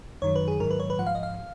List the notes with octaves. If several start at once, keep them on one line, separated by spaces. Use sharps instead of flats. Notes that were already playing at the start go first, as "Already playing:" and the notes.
F#2 D#3 F#3 C#5
B4
G#4
G#2 D#3 F#3 A#4
B4
C#5
B4
G#2 F3 F#5
F5
D#5
F5